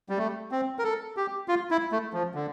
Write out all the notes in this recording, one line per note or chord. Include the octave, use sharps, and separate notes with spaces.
G3
A3
C4
A#4
A4
G4
F4
E4
A3
F3
D3